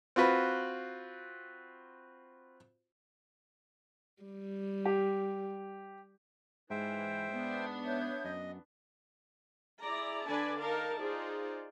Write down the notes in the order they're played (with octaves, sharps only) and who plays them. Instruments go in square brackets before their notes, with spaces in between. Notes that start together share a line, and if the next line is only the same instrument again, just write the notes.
[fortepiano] C4 F4 F#4 B4
[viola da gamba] G3
[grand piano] G4
[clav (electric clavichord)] G#2 G#3 [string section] E3 [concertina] C5 E5 G5
[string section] B3 D4
[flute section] C#5 E5 G6
[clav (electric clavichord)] F#2 [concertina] D#5
[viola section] E4 G#4 D5 A#5
D3 D4 B4 D5 G#5 A5
D#4 A#4 F5 A5
D#4 F4 G#4 C5 D5